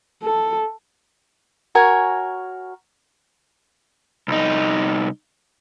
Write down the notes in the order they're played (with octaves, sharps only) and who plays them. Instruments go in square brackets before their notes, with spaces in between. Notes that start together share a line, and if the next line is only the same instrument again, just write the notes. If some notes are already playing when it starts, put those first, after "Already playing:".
[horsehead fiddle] A4
[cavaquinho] F#4 A#4 C#5 G#5
[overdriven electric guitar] C2 D#4